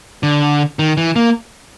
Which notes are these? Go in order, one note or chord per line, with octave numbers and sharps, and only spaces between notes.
D3
D#3
E3
A#3